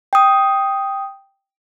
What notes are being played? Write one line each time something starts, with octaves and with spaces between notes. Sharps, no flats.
G5 D#6